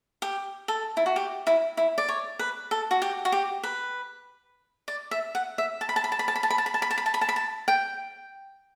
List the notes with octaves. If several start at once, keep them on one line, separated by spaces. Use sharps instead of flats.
G4
A4
E4
F#4
G4
E4
E4
D5
C#5
B4
A4
F#4
G4
F#4
G4
B4
D5
E5
F#5
E5
A5
B5
A5
B5
A5
B5
A5
B5
A5
B5
A5
B5
A5
B5
A5
B5
A5
B5
A5
B5
A5
G5